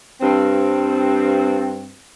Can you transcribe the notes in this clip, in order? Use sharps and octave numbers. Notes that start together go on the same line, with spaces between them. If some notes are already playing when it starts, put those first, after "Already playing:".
G2 C4